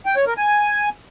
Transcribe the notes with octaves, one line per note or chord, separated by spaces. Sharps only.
G5
C#5
A#4
G#5